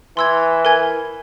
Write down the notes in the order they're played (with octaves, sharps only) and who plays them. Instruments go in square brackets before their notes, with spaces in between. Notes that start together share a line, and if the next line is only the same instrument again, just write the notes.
[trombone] E3 [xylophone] C6 E6 G#6
[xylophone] A#4 G#5 G#6